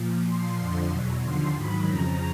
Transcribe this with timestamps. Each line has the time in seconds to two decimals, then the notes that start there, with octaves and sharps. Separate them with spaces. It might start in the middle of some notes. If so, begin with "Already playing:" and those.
Already playing: A#2 F3
0.23 A#2 F3 C6
0.56 F2 D3 F3 C6
0.90 E2 B2 F#3
1.22 D#2 D3 F3 C6
1.55 G#2 D#3 F#3 B5
1.88 F2 C#3 F3 A#5